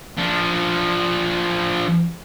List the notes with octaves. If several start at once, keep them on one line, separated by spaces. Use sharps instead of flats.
F3 D4